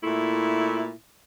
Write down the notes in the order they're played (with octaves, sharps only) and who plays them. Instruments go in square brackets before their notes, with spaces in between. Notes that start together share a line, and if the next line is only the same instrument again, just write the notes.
[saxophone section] A#2 A3 E4